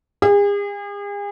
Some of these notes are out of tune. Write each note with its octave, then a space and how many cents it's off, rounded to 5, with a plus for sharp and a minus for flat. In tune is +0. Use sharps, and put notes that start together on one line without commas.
G#4 -40